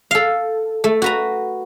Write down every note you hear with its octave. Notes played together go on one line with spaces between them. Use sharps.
A4 F5
A3
F#4 B4 A#5